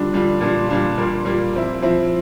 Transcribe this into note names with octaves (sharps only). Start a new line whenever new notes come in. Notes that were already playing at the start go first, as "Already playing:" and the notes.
Already playing: D3 G3 D4 F4
D3 G3 D4 F4
A#2 G3 D4 F4
A#2 G3 D4 F4
A#2 G3 A#3 F4
A#2 G3 A#3 F4
F3 C4 E4
F3 C4 E4